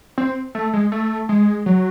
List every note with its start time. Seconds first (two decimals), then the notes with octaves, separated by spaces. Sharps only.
0.18 C4
0.55 A3
0.73 G#3
0.92 A3
1.29 G#3
1.66 F#3